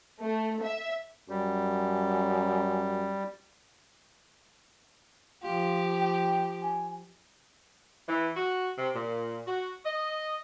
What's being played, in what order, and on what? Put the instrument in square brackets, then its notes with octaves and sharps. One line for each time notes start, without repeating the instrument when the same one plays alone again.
[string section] A3
E5
[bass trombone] F#2 [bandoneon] G3
[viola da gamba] F3 G4 [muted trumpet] F4
[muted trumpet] G5
G#5
[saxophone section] E3
F#4
C3
A#2
F#4
D#5